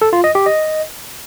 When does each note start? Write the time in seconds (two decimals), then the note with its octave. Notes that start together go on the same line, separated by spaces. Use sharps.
0.02 A4
0.13 F4
0.24 D#5
0.35 G4
0.46 D#5